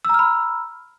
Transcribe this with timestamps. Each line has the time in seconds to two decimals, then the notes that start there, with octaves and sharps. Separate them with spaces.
0.05 E6
0.09 A#5
0.14 F6
0.19 B5